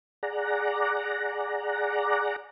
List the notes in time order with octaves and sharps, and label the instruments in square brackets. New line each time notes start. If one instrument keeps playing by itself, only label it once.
[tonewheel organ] G#4 D5 F#5 A#5